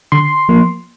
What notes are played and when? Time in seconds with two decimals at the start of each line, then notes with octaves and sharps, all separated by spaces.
0.12 D3 C6
0.49 F3 A#3